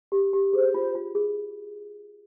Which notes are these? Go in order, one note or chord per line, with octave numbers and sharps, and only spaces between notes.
G4
G4
G#4 C5
F4
F4
G#4